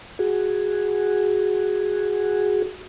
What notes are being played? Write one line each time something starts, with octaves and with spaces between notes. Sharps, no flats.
F#4 G#4